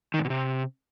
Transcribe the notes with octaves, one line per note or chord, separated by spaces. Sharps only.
D#3
G#2
B2
C3